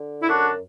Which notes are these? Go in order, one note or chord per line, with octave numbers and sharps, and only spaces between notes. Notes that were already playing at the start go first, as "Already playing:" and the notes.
Already playing: D3
E4
F#2 D4 F#4